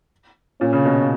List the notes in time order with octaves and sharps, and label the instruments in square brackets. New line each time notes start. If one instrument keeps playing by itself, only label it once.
[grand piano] A#2 [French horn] C#4
[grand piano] C#3
B2